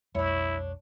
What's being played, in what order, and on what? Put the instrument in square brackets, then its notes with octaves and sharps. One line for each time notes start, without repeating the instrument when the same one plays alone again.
[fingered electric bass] B1 F2 G#3 [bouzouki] D4 C#5 [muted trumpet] E4